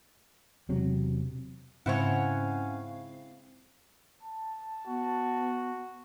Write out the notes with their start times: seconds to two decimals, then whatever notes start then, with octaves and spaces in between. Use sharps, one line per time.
0.69 E1 C3 F#3
1.86 G#2 C#3 C4 C#4 E4 C#5 F5 F#5
4.23 A5
4.86 B3 F#4